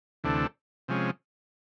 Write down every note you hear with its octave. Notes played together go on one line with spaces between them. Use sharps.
D2 C3 E3 A3 D4
C3 F3 G#3 C#4